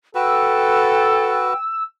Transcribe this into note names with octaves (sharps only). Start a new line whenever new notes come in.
F#4 A4 B4 G5 E6